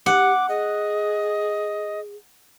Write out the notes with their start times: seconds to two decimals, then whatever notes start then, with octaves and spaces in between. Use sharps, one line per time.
0.06 G4 F#5 D6
0.49 G#4 D#5